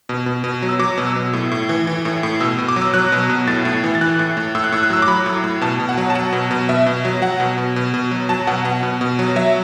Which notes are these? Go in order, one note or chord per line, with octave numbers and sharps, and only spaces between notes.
B2
B2
B2
F#3
E6
F#3 D6
B2
E6
B2
A2
A2
E3
E3
A2
A2
B2 E6
B2
D6
F#3
E6
F#3 F#6
B2
B2
A2 A6
A2
E3
A6
E3 F#6
A2
A2
A2 E6
F#6
A2 E6
F#6
F#3 E6
D6
F#3 B5
A2
A2
B2 A5
B2
F#5
F#3
A5
F#3 F#5
B2
B2
B2 E5
B2
F#3
F#3 F#5
B2
B2
B2
B2
F#3
F#3 A5
B2 F#5
B2 F#5
B2
B2
F#3
F#3 E5